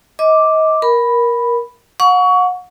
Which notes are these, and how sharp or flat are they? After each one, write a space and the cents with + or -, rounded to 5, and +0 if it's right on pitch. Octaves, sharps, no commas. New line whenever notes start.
D#5 +30 D6 +0
A#4 +15 B5 +0
F#5 -35 C#6 +25